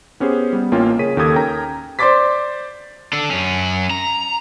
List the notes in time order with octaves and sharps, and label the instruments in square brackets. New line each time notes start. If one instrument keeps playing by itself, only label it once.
[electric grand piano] B3 C#4 G4 G#4 C5
G3 B3
A1 A#3 C#4 F4 G5
C#3 G#4 A#4 C#5 B6 D#7
D#2 A#3 G4 A4 D#6 G#6
C#4 A#4 G5 A#5
[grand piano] C5 D5 C6 D6 A6 B6
[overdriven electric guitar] D4 A4
F#2 C#4
A#5